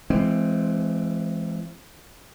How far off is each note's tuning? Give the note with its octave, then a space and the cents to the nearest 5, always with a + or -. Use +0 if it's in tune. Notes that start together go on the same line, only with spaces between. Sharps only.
E3 +35 G#3 +25 C4 +0